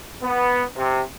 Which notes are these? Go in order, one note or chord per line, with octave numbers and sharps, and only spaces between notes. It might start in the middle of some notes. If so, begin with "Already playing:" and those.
B3
C3